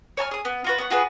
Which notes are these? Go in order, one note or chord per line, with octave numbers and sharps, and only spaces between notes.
C#5 G#5 A5 F6
G#4 D#6
B3
F4 F#4 B4
B3 F#5 C#6
F4 F#4 G#4 B4